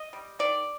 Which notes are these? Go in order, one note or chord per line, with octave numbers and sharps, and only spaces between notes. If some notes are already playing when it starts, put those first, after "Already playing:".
Already playing: D#5
G3
D#3 D5